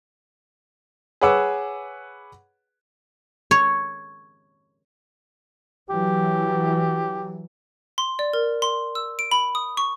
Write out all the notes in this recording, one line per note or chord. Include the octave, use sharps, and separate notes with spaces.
G#4 B4 C#5 F#5 D6 E6
C#5
E3 F#3 G4
C6
D5
A#4
C6
E6
D7
B5
D#6
C#6